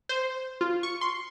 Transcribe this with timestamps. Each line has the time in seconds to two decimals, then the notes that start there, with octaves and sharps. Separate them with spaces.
0.09 C5
0.61 F4
0.83 C#6
1.01 C6